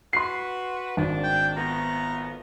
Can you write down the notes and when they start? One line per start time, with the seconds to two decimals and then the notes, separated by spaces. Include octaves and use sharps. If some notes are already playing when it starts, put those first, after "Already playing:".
0.13 F#4 B4 C6 C7
0.97 G#1 D#3 D4
1.23 G5
1.57 F3 A3 B3 A#5